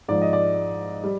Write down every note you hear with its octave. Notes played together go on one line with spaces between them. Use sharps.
G#2 F3 D5
D#5
D5
G3